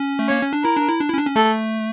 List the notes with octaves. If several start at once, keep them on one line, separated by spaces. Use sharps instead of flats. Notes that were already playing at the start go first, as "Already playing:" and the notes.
Already playing: C#4
A3
A#3 C#5
C#4
D4
E4 A#4
D4
E4
D4
E4
C#4
D4
C#4
A3 A4